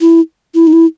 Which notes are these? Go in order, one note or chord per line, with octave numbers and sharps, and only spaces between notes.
E4
E4
D#4
E4